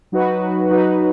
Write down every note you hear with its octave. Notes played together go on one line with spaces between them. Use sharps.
F#3 D#4 F#4 B4
F#3 D#4 F#4 B4